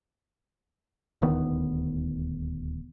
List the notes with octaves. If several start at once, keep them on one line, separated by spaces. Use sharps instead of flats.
D#1 D2 D#3 B3